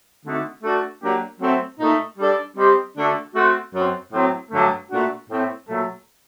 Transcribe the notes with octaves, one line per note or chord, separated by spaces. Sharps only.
D3 A3 C4 D#4 F#4
A3 D4 F#4 A4
F#3 A#3 D4 G4
F#3 A3 C4
A#2 A3 D#4
G3 D4 A4 D5
G3 C4 G4 C5 D#5
D3 A3 D4 F#4 A4
A3 C4 F#4
F#2 F#3 C4
A2 F#3 C4
G2 D3 F#3 A3
A#2 A3 D4 F#4
A2 A3 C4
A#2 F#3 A3